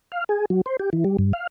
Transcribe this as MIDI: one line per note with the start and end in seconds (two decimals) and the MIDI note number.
0.12 0.24 77
0.29 0.45 68
0.50 0.61 54
0.66 0.77 72
0.79 0.90 67
0.93 1.04 52
1.04 1.17 55
1.18 1.33 43
1.33 1.47 77